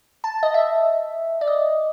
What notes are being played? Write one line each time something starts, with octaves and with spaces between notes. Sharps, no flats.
A5
D#5
E5
D5
D#5